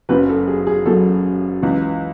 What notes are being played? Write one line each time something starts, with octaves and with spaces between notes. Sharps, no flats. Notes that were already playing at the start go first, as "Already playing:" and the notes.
F#1 F#2 C#3 B4
A4
G#4
G#4
F#1 F#2 C#3 A4
C#2 C#3 E3